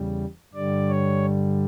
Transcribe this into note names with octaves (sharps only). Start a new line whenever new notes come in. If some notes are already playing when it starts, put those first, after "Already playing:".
Already playing: E2 C#3 G3
G2 D3 G3 D5
C#5